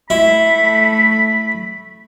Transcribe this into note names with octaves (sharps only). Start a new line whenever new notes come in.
A3 E4 B5